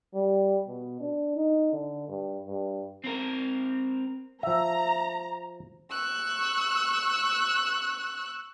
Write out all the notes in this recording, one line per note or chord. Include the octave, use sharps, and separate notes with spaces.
G3
B2
D4
D#4
D3
G2
G2
C4 A#4
F3 E5 A#5
C#6 E6 F#6